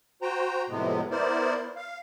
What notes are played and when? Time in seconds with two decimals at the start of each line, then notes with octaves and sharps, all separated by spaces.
0.22 F#4 C5 G5 A#5
0.69 F2 A2 C3 G#3 B3
1.11 B3 E4 A#4 C5 D5
1.76 F5